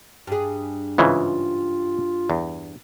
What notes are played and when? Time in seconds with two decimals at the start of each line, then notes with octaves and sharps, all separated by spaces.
0.27 G2 G#4
0.98 G#2 C#3 E3 F4
2.30 E2